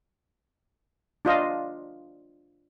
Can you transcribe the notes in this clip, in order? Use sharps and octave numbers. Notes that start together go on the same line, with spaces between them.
D4 F4 D#5 F5